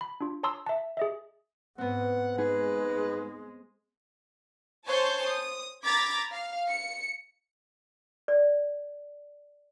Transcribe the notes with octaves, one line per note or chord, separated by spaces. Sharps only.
B5
D4 F4
C#5 A5 A#5 C6 D#6 E6
E5 A5
G#4 D#5 E5
G#2 B3 C4 F#5
G#2 G#3 G#4 B4
C5 C#5 G#5 A5 C#6 G6
D#6
A#5 B5 D6 G#6 A6 B6
F5
C#7
D5